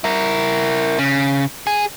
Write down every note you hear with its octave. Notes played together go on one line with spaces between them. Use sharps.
E4 A#4
C#3
G#4